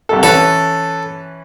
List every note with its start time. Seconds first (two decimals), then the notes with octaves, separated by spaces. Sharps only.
0.09 C2 G2 A4
0.23 E3 C#4 A4 B4